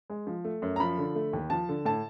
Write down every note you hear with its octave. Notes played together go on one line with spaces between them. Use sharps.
G#3
F3
A3
F#2
A#5
F3 B5
D3
A3
D#2
F3 A5
D3
A2 A5